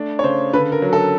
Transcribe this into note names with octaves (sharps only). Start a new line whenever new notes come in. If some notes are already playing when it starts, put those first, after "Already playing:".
Already playing: A3 D4
C#5
C#3 C5
D3 B4
A#4
F#3
A4